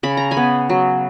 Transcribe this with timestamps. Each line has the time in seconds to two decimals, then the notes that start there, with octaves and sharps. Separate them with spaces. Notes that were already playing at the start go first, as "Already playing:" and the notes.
0.03 C#3 B5
0.17 A#5
0.31 G#5 B5
0.37 B3
0.69 F#3